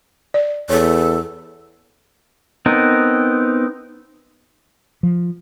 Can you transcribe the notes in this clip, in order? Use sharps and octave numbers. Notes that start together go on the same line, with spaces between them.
D5
E2 A4 C#5
B3 C4 D#4 A#4
F3